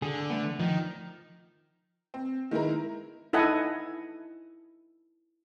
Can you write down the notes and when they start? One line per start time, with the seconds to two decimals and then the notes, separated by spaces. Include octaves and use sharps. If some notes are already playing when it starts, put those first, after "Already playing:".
0.02 D3 G#4
0.30 A3 B3
0.60 D#3 F3
2.14 C4
2.51 D#3 G#3 E4 A#4
3.33 D#4 E4 A4 D#5 F#5 G#5